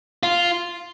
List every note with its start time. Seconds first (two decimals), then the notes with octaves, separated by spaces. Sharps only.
0.23 F4